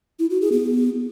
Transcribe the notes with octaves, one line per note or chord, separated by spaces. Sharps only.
E4
F#4
G#4
B3